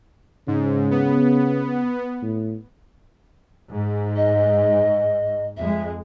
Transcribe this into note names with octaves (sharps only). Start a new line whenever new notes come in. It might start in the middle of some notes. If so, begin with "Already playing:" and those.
G#2 C#3
B3
A2
G#2
D#5
F2 G#3 E5